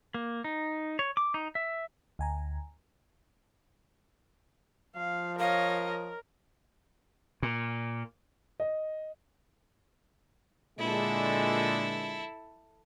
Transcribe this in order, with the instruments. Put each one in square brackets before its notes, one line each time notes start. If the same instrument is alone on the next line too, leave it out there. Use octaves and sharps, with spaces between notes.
[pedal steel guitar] A#3
D#4
C#5
D6
D#4
E5
[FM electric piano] D2 G#5 A#5
[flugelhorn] F3 [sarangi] F5
[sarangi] A#4 [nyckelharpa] C#5 D#5 [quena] F5
[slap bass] A#2
[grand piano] D#5
[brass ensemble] A#2 D3 G#3 [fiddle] E4 A4